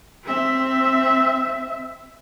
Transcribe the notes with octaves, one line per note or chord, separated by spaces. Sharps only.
C4 E5